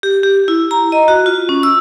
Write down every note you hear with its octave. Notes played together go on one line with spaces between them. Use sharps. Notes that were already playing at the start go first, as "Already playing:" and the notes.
G4
G4
E4
A#5
D#5
F#4
F4
C#4
E6